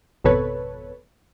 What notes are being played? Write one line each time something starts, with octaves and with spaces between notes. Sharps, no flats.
G#1 F2 B2 A4 B4 C#5